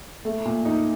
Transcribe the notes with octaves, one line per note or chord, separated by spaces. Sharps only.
A3
A#2
D#4